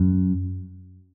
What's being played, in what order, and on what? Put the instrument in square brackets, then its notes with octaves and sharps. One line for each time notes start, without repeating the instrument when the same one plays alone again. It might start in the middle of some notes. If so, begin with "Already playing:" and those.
Already playing: [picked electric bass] F#2